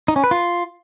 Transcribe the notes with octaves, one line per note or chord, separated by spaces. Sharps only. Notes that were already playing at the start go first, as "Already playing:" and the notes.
D#4
C#4
B4
F4